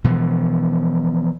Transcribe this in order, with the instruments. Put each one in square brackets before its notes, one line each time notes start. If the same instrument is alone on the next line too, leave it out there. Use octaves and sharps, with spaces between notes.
[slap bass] B2 E3 F3